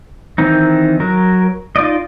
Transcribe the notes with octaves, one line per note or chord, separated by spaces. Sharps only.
D#3 E3 C4 D#4
F#3 A#4
D#4 F4 D5 D#5